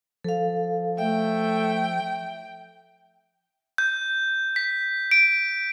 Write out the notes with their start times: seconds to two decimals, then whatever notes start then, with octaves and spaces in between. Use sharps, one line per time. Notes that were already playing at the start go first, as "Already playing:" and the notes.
0.24 F3 A4 F5
0.98 A3 E5 G5
3.78 G6
4.56 B6
5.11 D7